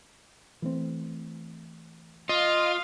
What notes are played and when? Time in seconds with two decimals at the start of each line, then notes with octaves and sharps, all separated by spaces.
0.62 E3 A3 C4
2.29 F4 D#5 F5